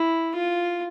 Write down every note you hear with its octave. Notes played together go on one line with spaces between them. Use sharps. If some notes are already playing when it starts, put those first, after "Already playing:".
Already playing: E4
F4